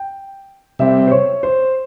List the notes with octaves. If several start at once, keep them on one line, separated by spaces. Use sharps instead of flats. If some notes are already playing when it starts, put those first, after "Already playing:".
Already playing: G5
C3 G3 C4 E5
C5
C#5
C5